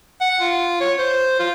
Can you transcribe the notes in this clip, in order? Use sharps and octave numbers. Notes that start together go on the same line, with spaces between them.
F#5
F4
C#5
C5
F4